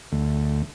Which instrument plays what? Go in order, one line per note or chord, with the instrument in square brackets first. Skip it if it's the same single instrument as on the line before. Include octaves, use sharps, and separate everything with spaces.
[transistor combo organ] D2